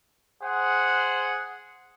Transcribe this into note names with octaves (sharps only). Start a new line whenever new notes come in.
G#4 C5 F#5